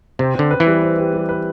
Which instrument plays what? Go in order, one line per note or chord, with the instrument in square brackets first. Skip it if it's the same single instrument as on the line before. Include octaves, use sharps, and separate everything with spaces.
[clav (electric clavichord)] C3 [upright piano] C4
[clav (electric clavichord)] D3 [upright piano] C4
[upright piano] B4
[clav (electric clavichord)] E3
[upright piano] G3
C4
G4
G3
B4